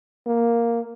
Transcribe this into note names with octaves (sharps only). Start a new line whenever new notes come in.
A#3